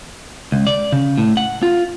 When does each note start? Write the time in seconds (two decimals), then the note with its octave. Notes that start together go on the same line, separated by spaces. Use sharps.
0.52 C#2
0.67 D5
0.92 C#3
1.18 A2
1.37 F#5
1.63 F4